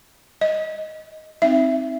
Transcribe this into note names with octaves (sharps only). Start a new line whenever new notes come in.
D#5
C4 D#4 E5